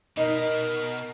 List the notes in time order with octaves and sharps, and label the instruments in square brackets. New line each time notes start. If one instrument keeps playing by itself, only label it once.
[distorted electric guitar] B2 [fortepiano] D#4 [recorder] A#4